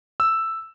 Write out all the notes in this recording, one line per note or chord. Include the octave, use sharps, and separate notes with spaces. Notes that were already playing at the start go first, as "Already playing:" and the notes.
E6